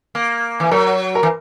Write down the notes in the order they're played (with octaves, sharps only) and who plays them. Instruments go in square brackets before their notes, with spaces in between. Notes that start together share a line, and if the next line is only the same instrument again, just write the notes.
[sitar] A#3
E3
[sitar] F#3 [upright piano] A#4
[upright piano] A#4
[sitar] E3